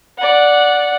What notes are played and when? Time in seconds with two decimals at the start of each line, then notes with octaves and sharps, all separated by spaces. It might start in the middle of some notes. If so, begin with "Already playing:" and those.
0.18 D5 F#5